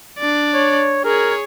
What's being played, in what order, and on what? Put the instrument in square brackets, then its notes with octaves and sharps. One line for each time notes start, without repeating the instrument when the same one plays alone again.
[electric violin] D4 D5
[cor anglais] C#5
[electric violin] G#4 C#5 [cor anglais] A#4